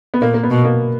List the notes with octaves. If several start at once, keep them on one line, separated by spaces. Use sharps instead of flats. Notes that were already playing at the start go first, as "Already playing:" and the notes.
B3
A#2 A#3
A#3
B3
B2
A#3